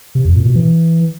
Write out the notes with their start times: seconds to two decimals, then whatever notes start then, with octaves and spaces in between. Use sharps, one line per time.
0.15 C3
0.25 F2
0.35 A#2
0.45 B2
0.56 E3